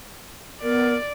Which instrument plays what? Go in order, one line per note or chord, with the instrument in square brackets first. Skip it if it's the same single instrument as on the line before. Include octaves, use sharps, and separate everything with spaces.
[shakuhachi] B3 [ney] A#4 [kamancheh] D5